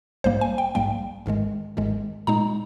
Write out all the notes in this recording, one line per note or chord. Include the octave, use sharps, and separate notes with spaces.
A#1 G#2 G3 A#3 C5
G#5
G5
A#1 G#2 G3 A#3 G5
G#1 G#2 D#3 G#3
G#1 G#2 D#3 G#3
A#2 G#3 D#4 A#5